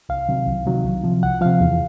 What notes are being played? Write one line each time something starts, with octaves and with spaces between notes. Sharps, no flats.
C2 F5
C3 D#3 F#3
C2
C3 D#3 F#3
C2
C3 F3
C2 F#5
C3 F3 F5
E2